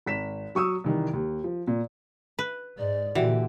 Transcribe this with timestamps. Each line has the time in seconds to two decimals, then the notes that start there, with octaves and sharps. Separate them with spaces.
0.06 G#1 B6 E7
0.55 F#3 C#6 D#6 E6
0.84 C2 D#3 E3
1.13 D#2
1.44 F3
1.67 A#2
2.39 B4
2.78 G#2 D5
3.15 A#2 D3 E3 F#4 G4